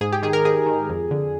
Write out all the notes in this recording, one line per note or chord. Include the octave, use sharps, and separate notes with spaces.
G#2 G#4
G4
D#3 G#4
A#4
G#2 G#4
D#3
F2
D3